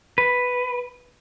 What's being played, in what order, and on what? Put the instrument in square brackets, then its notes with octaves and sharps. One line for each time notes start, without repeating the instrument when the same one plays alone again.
[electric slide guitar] B4